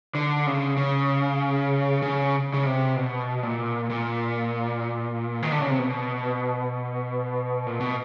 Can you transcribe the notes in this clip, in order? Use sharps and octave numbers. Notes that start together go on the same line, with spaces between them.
D3
C#3
C#3
C#3
C#3
C3
B2
A#2
A#2
D#3
D3
C#3
C3
B2
A#2
B2